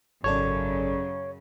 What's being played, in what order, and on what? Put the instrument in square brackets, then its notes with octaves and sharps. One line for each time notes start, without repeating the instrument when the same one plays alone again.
[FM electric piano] G#1 A4 D5 [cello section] F#2 C#3 [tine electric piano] C#5